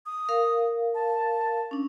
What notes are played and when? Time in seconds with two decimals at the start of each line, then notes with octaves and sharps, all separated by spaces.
0.06 D#6
0.29 A#4 F5
0.94 A5
1.71 C#4 D4